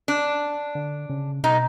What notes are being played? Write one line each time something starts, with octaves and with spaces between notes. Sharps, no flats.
D4
D3
C#3
B2 D#4